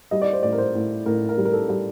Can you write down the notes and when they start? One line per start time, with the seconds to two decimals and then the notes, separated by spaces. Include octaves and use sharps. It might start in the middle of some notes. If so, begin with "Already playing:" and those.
0.11 G3 D#5
0.22 D5
0.33 C5
0.43 A2 D5
0.53 A#4
0.58 C5
0.75 A2
1.06 A2 A#4
1.29 A#4
1.38 G3
1.45 A#4
1.53 A4
1.69 G3